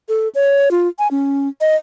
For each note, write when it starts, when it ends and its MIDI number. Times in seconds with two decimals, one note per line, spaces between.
0.09 0.28 69
0.35 0.69 73
0.71 0.88 65
0.99 1.08 80
1.11 1.48 61
1.61 1.76 75